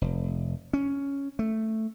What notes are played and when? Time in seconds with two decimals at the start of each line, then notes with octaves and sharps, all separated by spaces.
0.01 F1
0.73 C#4
1.39 A3